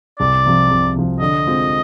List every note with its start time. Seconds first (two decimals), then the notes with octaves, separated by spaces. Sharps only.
0.19 C2 D5
0.46 C3 F3
0.71 C2
0.96 C3 F3
1.20 D3 D#5
1.46 G#3 C4 F4